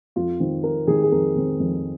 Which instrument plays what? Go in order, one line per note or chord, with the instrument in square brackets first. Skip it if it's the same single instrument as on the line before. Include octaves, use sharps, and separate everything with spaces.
[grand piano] F2 F4
D#3 C4
F2 A#4
D#3 C4 G#4
G#4
F2 A#4
D#3 C4
F2